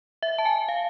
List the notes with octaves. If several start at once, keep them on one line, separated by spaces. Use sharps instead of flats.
E5
A5
G#5
F5